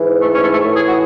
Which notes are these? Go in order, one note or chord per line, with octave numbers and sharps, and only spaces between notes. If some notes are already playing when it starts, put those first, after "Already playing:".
Already playing: G#2 E3
A3
C#4
A3
A3
A2 E3
G#4
F#4